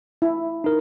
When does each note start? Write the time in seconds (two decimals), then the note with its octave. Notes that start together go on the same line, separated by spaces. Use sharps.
0.22 E4
0.64 D#4 A#4